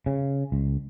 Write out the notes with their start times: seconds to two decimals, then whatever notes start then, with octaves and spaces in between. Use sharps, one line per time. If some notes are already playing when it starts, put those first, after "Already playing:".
0.06 C#3
0.52 C#2